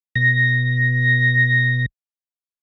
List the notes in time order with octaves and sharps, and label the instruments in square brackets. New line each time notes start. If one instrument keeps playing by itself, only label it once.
[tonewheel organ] B2 A#6